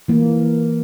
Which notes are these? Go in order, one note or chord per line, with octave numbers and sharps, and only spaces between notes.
E3 A#3